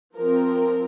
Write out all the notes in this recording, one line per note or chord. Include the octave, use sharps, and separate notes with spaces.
F3 C4 A#4